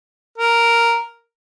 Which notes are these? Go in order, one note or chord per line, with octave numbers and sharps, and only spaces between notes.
A#4